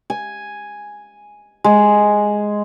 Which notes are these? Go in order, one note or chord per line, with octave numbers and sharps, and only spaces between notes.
G#5
G#3